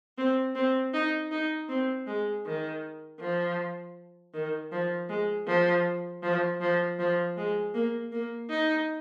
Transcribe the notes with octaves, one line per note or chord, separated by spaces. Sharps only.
C4
C4
D#4
D#4
C4
G#3
D#3
F3
D#3
F3
G#3
F3
F3
F3
F3
G#3
A#3
A#3
D#4